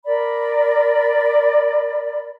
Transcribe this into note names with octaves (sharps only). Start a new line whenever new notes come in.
A#4 D5 B5